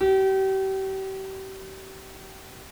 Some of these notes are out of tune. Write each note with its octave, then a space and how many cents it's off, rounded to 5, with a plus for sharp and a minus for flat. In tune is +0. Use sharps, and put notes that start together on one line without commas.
G4 -35